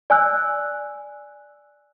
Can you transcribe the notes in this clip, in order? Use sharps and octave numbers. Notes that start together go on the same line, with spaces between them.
D5 G#5 E6 F#6